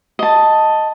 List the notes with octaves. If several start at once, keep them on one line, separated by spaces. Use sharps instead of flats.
D#5 A5